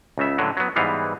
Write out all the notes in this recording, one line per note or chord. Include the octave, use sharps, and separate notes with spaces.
C#2 C#3 E5
A2 D3 F#3
F#3 B3
G#2 E3 G3 B3 F5